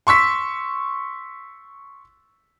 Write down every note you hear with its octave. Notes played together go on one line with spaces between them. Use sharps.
C6 C#6 E6 B6